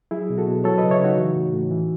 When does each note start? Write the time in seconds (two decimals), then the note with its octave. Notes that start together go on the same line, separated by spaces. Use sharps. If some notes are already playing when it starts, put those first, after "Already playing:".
0.11 F#3 E4 G#4
0.30 B2
0.38 F#4 A4
0.47 B2
0.64 F#3 A4 C#5
0.78 C#3 B4 D#5
0.91 C#5 E5
1.00 C#3 D#4 F#4
1.17 E3
1.35 A2
1.53 A2
1.71 E3